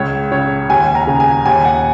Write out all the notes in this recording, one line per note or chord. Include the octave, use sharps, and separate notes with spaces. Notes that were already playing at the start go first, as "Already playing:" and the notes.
Already playing: C#2 C#5
C#3 C#5
D#2 G#5
A#5
C#3
G#5
D#2 G#5
F#5